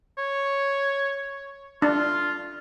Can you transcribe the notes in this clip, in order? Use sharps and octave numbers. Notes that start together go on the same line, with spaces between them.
C#5
D4 F4